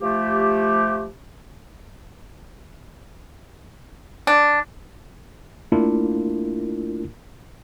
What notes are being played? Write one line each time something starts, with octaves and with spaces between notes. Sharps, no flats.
F3 A3 G4
D4
A3 A#3 D4 E4 F4 A#4